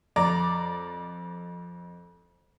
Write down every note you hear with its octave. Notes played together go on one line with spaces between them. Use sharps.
F2 D5 A#5